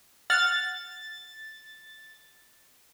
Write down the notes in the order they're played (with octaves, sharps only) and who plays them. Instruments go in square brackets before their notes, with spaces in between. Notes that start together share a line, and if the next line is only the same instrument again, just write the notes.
[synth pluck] F#5 F6 [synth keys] A6